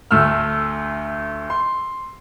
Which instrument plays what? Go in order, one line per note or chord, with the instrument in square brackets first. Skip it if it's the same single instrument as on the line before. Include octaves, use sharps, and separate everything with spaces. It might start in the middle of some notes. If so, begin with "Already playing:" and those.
[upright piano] D2 A3 E6 F6
C6